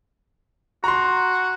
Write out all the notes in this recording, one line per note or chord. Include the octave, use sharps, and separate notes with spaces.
F#4 A#5 C6